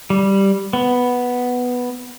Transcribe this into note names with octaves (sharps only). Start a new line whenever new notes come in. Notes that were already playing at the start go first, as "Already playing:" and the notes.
G3
B3